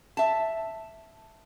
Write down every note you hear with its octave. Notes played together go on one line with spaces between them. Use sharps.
E5 A5